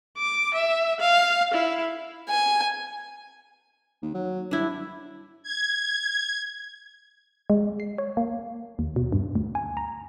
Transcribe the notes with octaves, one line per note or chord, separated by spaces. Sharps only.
D6
E5
F5
E4
G#5
D#2
F#3
G2 D4 E4
G#6
G#3
C7
C#5
A#3
D#2
B2
G2
D2
G#5
A#5